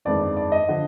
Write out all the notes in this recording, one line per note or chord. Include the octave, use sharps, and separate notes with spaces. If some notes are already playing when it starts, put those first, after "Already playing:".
G1 F2 D#3 G#3 D5
D5
D#5
D3 F3